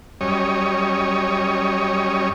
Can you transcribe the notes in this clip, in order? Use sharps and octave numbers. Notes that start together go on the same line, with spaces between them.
F#2 G3 C#4 C#5 D#5